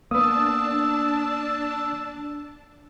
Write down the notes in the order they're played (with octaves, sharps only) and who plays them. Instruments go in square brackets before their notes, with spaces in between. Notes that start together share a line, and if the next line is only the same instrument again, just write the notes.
[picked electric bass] A#3 B3 [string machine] D4 A5 [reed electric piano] D#6 [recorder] E6